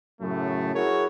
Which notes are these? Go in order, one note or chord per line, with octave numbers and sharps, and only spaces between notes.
F#2 A2 C#3 F#3 A3
E4 F#4 G#4 A#4 C#5